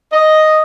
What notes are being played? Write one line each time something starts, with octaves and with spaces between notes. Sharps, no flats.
D#5